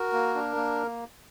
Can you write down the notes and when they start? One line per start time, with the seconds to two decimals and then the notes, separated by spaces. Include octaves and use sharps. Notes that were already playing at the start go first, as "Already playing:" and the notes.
Already playing: F#4 A#4
0.13 A#3
0.35 D4
0.56 A#3